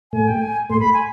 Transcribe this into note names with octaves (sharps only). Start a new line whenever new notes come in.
A2 A3 G#5
G5
G#5
A2 A3 C6
B5
G#5